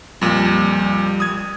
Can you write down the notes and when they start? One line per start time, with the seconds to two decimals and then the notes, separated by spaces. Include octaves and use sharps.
0.21 F2 A#2 G3
1.20 D#6 G#6